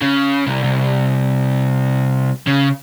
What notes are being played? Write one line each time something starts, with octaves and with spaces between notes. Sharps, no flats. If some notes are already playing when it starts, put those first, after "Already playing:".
C#3
C2
C2
C#3